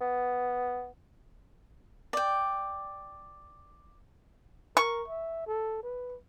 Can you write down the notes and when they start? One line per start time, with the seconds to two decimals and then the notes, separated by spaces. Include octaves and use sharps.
0.01 B3
2.13 D5 G5
4.77 A#4 C#6
5.08 E5
5.47 A4
5.83 B4